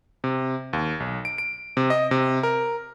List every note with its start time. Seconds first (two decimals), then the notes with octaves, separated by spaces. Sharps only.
0.24 C3
0.73 D#2
1.00 B1
1.25 D7
1.38 D7
1.77 C3
1.90 D#5
2.11 C3
2.43 A#4